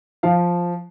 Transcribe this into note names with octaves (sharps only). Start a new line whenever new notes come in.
F3 F5